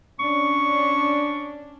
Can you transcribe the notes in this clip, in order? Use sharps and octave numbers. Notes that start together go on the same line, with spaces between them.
C#4 D4 C#6